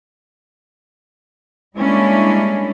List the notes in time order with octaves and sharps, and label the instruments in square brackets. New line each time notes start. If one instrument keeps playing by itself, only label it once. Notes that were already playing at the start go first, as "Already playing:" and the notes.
[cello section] G3 G#3 A#3 C#4 D4 E4